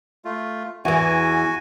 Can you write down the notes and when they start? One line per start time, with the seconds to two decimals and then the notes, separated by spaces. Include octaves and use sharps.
0.25 A3 F4
0.85 E2 E3 F#4 G#5